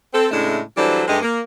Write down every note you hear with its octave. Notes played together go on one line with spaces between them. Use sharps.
C4 A4
A2 C#3 G#3 A3 D4 E4
E3 F#3 G3 D4 A4 C5
G2 G#3 A3 G4 D#5
A#3